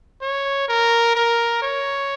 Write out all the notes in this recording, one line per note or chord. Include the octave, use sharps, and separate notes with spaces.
C#5
A#4
A#4
C#5